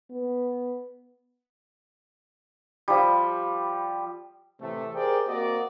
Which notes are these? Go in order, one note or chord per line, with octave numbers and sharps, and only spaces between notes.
B3
F3 G3
A2 C3 E3 A3
G4 G#4 A#4 C5 D5 G5
A#3 C4 F#4 A#4 D5 D#5